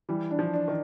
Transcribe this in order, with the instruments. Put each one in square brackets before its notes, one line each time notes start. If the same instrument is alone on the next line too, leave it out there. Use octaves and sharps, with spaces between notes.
[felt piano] E3 [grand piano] G3
[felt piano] D4
[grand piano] F3
[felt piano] D4
[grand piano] D#3